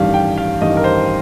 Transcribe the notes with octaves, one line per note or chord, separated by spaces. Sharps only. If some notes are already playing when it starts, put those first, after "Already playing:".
Already playing: A1 G2 D#3 G3 F5
G5
F5
A1 G2 D#3 G3 D#5
A#4
C5